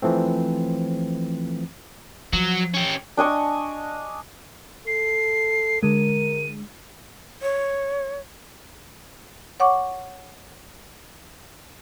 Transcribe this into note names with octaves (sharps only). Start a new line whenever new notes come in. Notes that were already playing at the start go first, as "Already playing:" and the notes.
E3 F3 A3 C4
F3 F#3
C#4 G4
D4 D#5 G#5 C#6
A4 C7
D3 G#3 A#4 D#7
C#5
C#5 F#5 C#6 D6